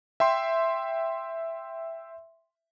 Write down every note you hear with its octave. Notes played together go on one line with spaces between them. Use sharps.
E5 G5 C6